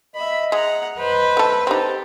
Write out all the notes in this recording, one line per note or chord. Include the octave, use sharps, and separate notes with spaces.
D#5 E5 B5
G#3 F#5 A#5
B4 C5 D#5
A3 A4
C4 D#4 G4 A4 C5